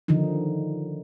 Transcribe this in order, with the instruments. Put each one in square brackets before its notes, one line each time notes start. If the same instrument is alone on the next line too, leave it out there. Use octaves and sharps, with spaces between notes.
[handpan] D3 D#3 F3 D#4